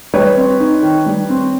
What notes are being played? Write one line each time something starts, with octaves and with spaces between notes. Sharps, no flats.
G3 B4 C#5
C4
D#4
D#3
G3
C4